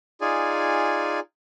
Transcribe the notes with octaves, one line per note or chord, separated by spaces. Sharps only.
D#4 F4 G#4 D5 G#5